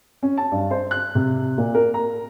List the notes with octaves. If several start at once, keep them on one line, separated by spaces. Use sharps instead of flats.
C#4
A5
G2
C5
F#6
C3
A#2
A#4
A#5